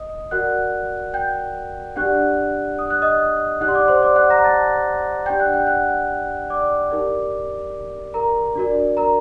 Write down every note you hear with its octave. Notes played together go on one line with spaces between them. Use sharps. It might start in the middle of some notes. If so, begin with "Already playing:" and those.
Already playing: D#5 D#6
F#4 A#4 D5 F#5 F#6
G5 G6
D4 G4 D5 F#5 F#6
D#6
F#6
D#5 D#6
D#4 G4 D5 F#5 F#6
C6
D5 D6
C5 C6
D5 D6
F#5 F#6
A#5 A#6
A5 A6
D4 G4 D5 G5 G6
F#5 F#6
G5 G6
F#5 F#6
D5 D6
D#4 G4 A#4 D5
A#4 A#5
D4 F#4 A#4 D5
A#4 A#5